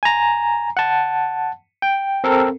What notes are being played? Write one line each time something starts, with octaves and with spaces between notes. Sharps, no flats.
G#5 A#5
F#5 A5
G5
C4 A4 A#4